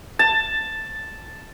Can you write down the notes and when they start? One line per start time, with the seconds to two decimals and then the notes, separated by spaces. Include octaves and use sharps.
0.19 A5